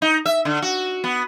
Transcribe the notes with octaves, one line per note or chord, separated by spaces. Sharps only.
D#4
E5
D3
F#4
B3